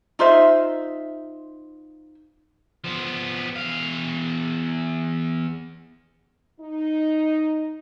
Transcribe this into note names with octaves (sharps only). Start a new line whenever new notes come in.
D#4 F4 C5 E5
F3 B3
E2 F5
D#4